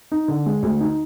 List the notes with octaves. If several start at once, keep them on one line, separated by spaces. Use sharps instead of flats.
D#4
D3
G#3
D2
D#4